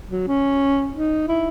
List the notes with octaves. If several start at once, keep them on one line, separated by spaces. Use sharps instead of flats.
F#3
C#4
D#4
E4